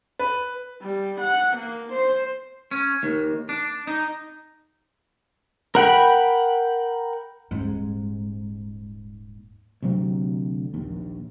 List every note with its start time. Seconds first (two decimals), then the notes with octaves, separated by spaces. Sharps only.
0.19 B4
0.82 G3
1.21 F#5
1.57 A#3
1.93 C5
2.71 C#4
3.03 D#2
3.49 D4
3.87 D#4
5.75 A#4 F#5 G5 B5
7.51 D#1 G#2
9.83 D2 C3 F#3 C4
10.74 A#1 D#2